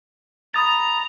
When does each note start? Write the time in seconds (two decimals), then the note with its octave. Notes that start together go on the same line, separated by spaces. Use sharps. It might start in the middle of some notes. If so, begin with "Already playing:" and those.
0.54 A#5 B5 D#6 A6